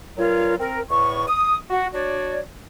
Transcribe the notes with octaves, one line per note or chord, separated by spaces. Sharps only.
G2 F#3 F4 A#4 C#5
C4 A#4
E2 A2 C#6
D#6
F#4
D4 F#4 C#5 D5